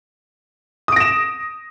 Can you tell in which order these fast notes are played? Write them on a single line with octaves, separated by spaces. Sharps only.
D#6 D7 A#6 E7